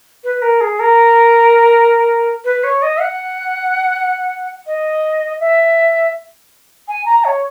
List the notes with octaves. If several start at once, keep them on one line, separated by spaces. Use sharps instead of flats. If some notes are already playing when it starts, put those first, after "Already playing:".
B4
A#4
G#4
A#4
B4
C#5
D#5
F#5
D#5
E5
G#5
A#5
C#5